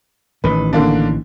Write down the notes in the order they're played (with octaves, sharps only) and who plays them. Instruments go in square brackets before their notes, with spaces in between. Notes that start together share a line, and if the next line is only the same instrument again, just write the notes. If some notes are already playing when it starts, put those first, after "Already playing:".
[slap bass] A1 A2 D#3 [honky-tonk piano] B4
[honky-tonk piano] D3 A#3 D4